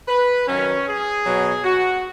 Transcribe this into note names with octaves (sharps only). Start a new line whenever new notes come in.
B4
F#2 D#3 F#3 C#4
G#4
B2 F#3
F#4